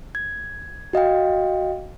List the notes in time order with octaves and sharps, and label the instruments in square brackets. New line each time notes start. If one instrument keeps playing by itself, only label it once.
[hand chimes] G#6
F#4 D#5 F5 G5